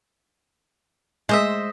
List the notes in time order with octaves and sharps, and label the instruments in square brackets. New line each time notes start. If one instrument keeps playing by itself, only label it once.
[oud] G#3 [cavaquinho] C5 D#5 E5